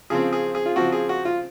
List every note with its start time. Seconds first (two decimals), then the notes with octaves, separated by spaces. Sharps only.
0.10 C#3 F3 C4 G#4
0.33 G#4
0.55 G#4
0.66 F4
0.76 C#3 F3 C4 F#4
0.92 G#4
1.09 F#4
1.25 F4